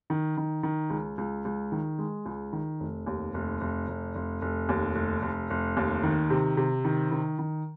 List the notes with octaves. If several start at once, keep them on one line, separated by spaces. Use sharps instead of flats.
D#3
D#3
D#3
C#2
C#2
C#2
D#3
G#3
C#2
D#3
F1
D#2
F1
F1
F1
F1
F1
D#2
F1
F1
F1
D#2
D#3
C3
C3
D#3
D#3
D#3